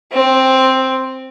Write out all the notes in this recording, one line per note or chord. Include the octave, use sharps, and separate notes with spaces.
C4